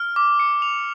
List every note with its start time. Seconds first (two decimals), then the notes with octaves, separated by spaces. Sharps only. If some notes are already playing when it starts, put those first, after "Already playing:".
Already playing: F6
0.16 D6
0.39 C#7
0.62 F7